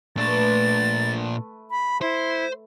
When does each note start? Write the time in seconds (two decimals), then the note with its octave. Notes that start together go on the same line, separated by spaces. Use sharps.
0.17 A#2 A3 D4 B4 A6
1.71 B5
2.01 E4 C5